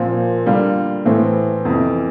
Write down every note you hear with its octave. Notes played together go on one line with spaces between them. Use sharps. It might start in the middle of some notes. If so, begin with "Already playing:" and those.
Already playing: A#2 F3 C4 F4
D3 G3 A#3 F4
A2 E3 A3 C4
F2 C3 E3